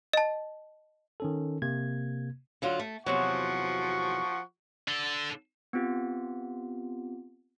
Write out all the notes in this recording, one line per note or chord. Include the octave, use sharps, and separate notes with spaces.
D#5 A5
D#3 C#4 A4
C3 A#3 G#6
D3 F#3 F4
A3
E2 C3 F3 F#3 F#5 C#6
D3 A4
B3 C4 F4 G4